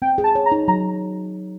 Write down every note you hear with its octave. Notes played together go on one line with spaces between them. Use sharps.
C4 G5
G#4
A5
C#5
A#5
D#4
F#3 A#5